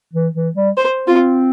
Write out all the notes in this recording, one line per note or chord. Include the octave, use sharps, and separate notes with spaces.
E3
E3
G3
C5
C4 F4